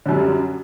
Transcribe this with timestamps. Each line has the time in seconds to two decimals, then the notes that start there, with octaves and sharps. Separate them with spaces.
0.06 D3
0.09 F#2
0.12 G3